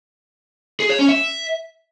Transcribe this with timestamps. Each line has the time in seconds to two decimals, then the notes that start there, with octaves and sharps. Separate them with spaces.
0.80 G#4
0.90 C#5
0.99 C#4
1.09 E5